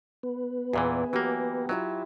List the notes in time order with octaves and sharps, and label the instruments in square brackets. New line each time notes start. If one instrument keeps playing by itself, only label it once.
[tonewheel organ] B3
[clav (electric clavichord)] E2 A#2 E3 [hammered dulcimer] G#4 E5
[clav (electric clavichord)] E3 A#3 [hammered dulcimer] F#3 G4 F#5
[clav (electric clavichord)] F#3 [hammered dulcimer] E4 F4 E5